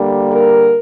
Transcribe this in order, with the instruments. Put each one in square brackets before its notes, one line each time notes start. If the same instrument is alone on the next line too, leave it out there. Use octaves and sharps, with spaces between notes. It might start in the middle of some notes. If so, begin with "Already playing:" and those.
Already playing: [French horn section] D3 G3 A#3
A#4